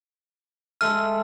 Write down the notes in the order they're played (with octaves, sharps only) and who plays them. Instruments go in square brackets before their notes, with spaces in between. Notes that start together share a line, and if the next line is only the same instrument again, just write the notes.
[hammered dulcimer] G#3 A4 E5 [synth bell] F6